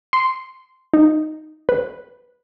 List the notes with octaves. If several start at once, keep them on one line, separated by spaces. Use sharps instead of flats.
C6
D#4
B4